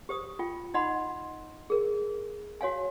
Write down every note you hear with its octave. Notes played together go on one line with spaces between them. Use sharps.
G4 C5 D#6
F4 G5
D#4 D#5 F#5 B5 C6
G#4 A#4
F#4 C#5 F5 G#5